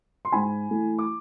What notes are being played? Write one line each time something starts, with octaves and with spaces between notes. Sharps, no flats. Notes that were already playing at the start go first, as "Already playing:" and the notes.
C6
G#2 G#5 B5
E3 A3 E4
D6